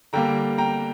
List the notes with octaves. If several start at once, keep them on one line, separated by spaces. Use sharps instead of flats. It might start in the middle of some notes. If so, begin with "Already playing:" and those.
D3 G3 A#3 G5 A#5
G5 A#5